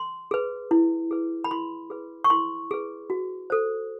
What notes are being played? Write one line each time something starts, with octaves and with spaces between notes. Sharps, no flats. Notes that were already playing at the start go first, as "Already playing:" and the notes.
Already playing: C6
G#4 B4
E4
G#4 B4
B5
E4 C6
G#4 B4
C#6
E4 C6
G#4 B4
F#4
A4 C5